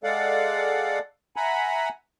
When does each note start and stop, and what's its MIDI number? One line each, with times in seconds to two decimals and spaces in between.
0.04 0.99 56
0.04 0.99 69
0.04 0.99 74
0.04 0.99 77
0.04 0.99 78
1.36 1.89 76
1.36 1.89 78
1.36 1.89 80
1.36 1.89 82
1.36 1.89 83